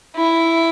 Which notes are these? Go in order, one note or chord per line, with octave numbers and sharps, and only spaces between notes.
E4